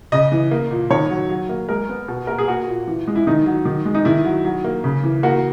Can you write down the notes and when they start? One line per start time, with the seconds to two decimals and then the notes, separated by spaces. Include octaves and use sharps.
0.12 C#3 D#5
0.32 E3
0.51 A#3
0.70 A#2
0.90 D#3 C#5
1.10 F#3
1.30 F#3
1.49 A#3
1.69 G#3 A#4
1.89 B3
2.08 B2
2.27 A#3 A#4
2.38 G#4
2.47 A#3 F#4
2.67 A#2
2.87 E3
3.07 G#3
3.16 E4
3.27 D#3 D#4
3.46 F#3
3.65 D#3
3.85 G#3
3.94 D#4
4.05 D#3 E4
4.25 F#3
4.45 F#3
4.64 A#3
4.84 C#3
5.03 E3
5.23 A#3 F#4